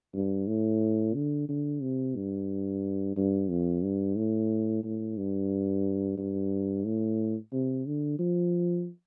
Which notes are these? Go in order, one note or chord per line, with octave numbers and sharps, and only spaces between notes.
G2
A2
D3
D3
C3
G2
G2
F2
G2
A2
A2
G2
G2
A2
C3
D3
F3